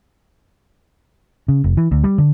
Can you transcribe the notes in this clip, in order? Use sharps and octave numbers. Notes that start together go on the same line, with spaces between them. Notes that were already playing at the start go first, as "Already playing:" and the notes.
C#3
F1
E3
D2
G3
D3